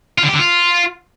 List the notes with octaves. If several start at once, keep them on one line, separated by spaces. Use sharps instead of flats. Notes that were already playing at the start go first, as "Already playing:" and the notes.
F4
D3
G4
D3
F4